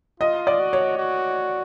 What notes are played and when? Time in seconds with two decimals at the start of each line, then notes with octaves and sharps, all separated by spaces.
0.20 F4 D#5
0.47 D5
0.60 F#4
0.73 C#5
0.98 F#4